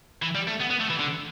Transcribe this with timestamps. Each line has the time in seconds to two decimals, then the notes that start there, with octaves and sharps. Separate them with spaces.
0.22 E3
0.35 G3
0.48 A3
0.61 B3
0.71 B3
0.81 A3
0.90 E3
1.00 D3